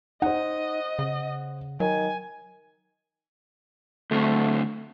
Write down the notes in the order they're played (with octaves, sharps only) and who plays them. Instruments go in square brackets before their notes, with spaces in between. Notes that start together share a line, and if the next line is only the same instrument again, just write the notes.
[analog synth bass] D#4 [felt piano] C5 F#5 [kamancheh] D#5
[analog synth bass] C#3
[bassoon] D#3 [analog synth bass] F#3 [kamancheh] G#5
[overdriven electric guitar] D2 C4 [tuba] A3